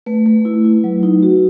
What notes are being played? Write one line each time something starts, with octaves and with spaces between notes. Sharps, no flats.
A3 B4
A3
E4
E4
F#3
D#4
F#4